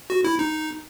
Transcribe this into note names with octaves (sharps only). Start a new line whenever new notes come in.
F#4
E4
D#4